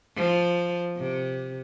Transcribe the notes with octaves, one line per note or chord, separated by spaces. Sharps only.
F3
C3